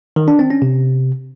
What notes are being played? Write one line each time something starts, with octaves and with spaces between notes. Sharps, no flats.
D#3
D4
C4
C#4
C3